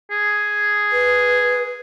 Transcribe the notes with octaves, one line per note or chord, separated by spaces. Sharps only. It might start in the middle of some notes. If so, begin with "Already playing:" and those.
G#4
B4